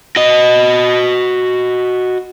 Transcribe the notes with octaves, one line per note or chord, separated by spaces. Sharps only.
F#4 D#5